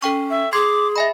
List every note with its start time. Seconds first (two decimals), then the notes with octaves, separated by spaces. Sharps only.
0.02 C#4 A4 G5 C#6
0.30 E5
0.53 G#4 C6 D6 G#6 C7
0.96 D#5 E5 G#5 B5